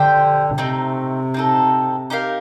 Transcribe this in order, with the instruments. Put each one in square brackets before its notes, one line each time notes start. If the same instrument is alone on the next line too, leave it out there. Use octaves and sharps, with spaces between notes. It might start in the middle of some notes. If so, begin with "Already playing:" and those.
Already playing: [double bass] D3 [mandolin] G4 C5 G5
[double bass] C3 [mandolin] A3 C4 D#4
[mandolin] C4 D#4 A4
D#4 G4 A#4 F5